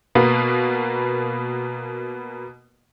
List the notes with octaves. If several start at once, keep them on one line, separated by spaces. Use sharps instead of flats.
B2 A#3 B3